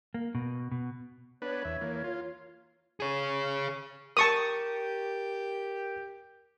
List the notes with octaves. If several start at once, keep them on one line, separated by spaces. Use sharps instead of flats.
A#3
B2
B2
B3 D4 B4 C#5
E2 E5
E3 A#3
F4
G#4 C#5
G4 A#4 A5 C#6 D#6 A6